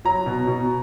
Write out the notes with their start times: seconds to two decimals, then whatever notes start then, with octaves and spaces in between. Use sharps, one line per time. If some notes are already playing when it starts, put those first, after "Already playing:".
0.05 F#3 A#5
0.26 B2
0.47 B2